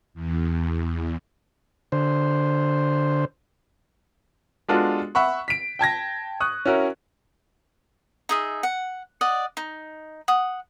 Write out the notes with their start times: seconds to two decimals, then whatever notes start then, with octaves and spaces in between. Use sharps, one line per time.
0.14 E2
1.92 D3 C5
4.69 G#3 B3 D4 F4 F#4 A4
5.15 E5 F#5 B5 C#6
5.48 B6 D7
5.79 G5 A5 G#6 A#6
6.40 C#6 D#6 F#6
6.65 C#4 E4 F#4 A#4 C#5
8.29 D#4 G#4 E5
8.63 F#5
9.21 D5 D#5 F#5
9.57 D#4
10.28 F#5 D#6